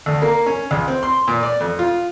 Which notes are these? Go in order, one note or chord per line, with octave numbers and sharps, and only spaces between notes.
D2
A#3
C#4
C#2
C4
C6
A#2
D5
F2
F4